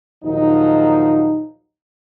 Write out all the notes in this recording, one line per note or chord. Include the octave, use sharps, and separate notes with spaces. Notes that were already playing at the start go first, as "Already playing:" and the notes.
A#1 D#2 F3 F#3 D#4